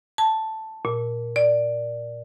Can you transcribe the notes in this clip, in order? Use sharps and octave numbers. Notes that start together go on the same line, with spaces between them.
A5
A#2
D5